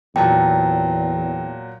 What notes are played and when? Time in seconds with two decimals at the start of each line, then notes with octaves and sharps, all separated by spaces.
0.16 E2 A#2 F#3 G5 A5